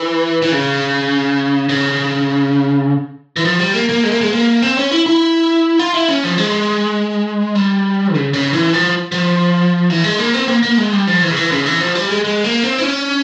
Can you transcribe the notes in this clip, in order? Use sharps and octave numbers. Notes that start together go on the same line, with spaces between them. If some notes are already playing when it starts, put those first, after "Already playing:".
Already playing: E3
E3
C#3
C#3
E3
F3
G3
A#3
A#3
G#3
A#3
G#3
A#3
C4
C#4
E4
E4
F4
E4
C#4
F3
G#3
G3
C#3
C#3
E3
F3
F3
E3
G#3
A#3
C4
A#3
A#3
G#3
G3
F3
E3
C#3
E3
C#3
E3
F3
G3
G#3
G#3
A#3
C4
E4
C#4